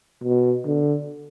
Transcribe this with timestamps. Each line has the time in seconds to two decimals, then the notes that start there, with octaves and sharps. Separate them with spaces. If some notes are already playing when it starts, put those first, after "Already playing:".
0.23 B2
0.66 D3